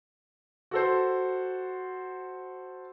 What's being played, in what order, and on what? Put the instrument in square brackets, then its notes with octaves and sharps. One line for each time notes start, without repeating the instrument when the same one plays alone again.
[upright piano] F#4 A4 C5